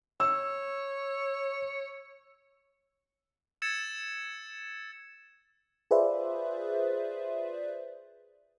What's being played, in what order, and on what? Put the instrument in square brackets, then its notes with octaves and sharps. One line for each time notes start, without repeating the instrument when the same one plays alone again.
[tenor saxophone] C#5 [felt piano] E6
[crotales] E6 G#6 A6 C#7 E7
[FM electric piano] F4 G#4 B4 C5 D5 E5